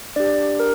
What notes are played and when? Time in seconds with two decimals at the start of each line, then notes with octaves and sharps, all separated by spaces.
0.16 D4 G4 D5
0.60 A#4